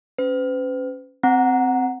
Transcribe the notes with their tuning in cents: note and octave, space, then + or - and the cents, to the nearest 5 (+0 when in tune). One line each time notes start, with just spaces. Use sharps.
C#4 +0 B4 +45
C4 -10 F#5 +0 A#5 +0